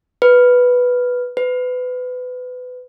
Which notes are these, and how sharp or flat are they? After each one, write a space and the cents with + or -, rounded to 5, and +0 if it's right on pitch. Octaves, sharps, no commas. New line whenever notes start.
B4 +0
B4 +25